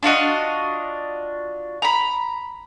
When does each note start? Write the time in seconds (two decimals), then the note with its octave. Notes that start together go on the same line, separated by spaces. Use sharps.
0.03 D4 F4 F#4 D#5
1.82 A#5 B5